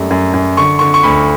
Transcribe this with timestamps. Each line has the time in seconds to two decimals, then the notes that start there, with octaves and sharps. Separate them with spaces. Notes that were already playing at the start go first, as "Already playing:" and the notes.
Already playing: F#2 G3 A3
0.11 F#2
0.34 F#2
0.57 D3 C#6
0.79 D3 C#6
0.94 C#6
1.03 D2 B5